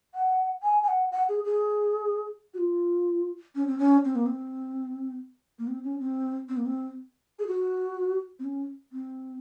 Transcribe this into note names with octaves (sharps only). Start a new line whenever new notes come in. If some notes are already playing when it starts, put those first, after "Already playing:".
F#5
G#5
G#5
F#5
F#5
G#4
G#4
F#4
F4
C#4
C4
C#4
C4
A#3
C4
A#3
C4
C#4
C4
C4
A#3
C4
G#4
F#4
C4
C#4
C4